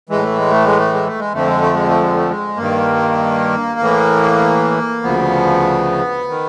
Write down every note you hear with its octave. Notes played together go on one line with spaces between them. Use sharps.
A2 E3 G#3
A3
G#3
A3
G#3
A3
G#3
A3
G#3
F2 D3 F3 A3
G#3
A3
G#3
A3
G#3
A3
G#3
G2 D#3 A#3
A2 E3
D2 C#3 F3 B3
D#3